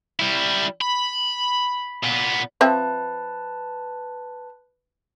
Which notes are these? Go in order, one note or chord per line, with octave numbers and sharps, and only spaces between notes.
G3 E4
B5
A#2 B3
F3 C4 B4 E5 A5